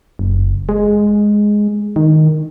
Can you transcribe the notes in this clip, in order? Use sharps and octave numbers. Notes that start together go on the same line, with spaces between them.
F#1
G#3
D#3